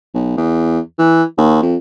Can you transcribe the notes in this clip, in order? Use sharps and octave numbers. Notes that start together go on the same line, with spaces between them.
B1
E2
E3
D#2
F2